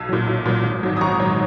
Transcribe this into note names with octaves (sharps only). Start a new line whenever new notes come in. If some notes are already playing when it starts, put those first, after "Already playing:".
Already playing: B1 E6 G#6
A#2 F#3
B1
A#2 F#3
G#1
G#2 F#3
D#6
G#1 A#5 C#6
F#3